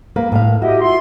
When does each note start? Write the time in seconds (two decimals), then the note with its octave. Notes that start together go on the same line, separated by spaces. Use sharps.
0.16 A#3 B4
0.32 A2 F5
0.62 E4 F#4 G4 D#5
0.80 E4 F4 C6